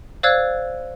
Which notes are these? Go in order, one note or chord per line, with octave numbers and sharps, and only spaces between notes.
C5 D5 F5 E6 F#6 G#6